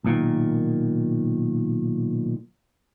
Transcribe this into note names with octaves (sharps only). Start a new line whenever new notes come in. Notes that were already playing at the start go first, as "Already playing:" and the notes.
B1 A#2 D#3